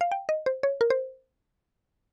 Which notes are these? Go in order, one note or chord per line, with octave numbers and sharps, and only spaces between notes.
F5
G5
D#5
C5
C#5
A#4
C5